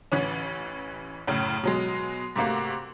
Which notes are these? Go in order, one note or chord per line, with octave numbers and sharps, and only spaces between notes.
A1 E3 C#4
F#2 A2 C#3
B2 F#3 G#3
G#2 C3 A3 A#3 F#4